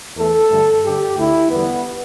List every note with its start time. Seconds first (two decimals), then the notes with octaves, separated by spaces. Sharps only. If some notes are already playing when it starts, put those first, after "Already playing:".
0.17 E2 E3 A3 A4
0.50 G2 D3 A3
0.84 G2 D3 G3 G4
1.16 D2 D3 A3 E4
1.50 E2 D3 G3 B3